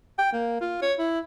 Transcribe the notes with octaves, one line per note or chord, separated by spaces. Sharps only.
G5
A#3
F4
C#5
E4